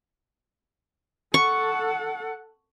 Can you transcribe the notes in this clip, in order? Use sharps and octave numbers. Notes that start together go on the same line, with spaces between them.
A4 F#5 C#6